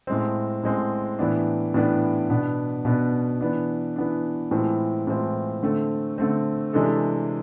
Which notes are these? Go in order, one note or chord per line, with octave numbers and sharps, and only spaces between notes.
A2 G#3 C4
A2 G#3 C4
A2 E3 B3 D4
A2 E3 B3 D4
B2 B3 D4
B2 B3 D4
E3 B3 D4
E3 B3 D4
A2 E3 G#3 C4 F4
A2 E3 G#3 C4 F4
D3 A3 C4
D3 A3 C4
C3 E3 G#3 D4 A4